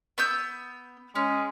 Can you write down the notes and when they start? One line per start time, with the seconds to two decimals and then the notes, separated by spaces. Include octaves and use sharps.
0.18 B3 E6 G6
1.15 G#3 C#4